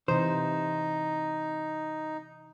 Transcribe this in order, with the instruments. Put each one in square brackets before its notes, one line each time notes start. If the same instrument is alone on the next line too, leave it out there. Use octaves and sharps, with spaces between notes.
[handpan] C3 E3 [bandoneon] D#4 [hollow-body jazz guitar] C5